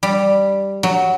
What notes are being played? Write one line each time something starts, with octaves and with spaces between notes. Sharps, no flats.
G3
F#3